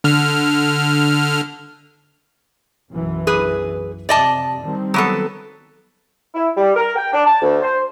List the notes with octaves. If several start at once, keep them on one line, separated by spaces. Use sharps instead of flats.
D3 F6
B1 F#2 E3
G#4 B4
F2 C3 D5 D#5 A5
D#3 G3 C4
F#3 B3 A4
E4
G3
A#4
G5
D4
A5
D2
C5